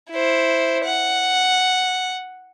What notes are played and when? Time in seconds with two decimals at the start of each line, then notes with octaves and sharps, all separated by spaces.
0.11 E4 C5
0.84 F#5